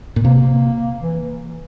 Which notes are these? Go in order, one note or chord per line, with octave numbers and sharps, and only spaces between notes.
A#2
C3 A#3
E3